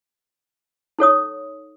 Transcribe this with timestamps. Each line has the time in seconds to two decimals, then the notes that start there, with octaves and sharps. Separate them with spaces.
0.99 D#4 A4 C#5 D#6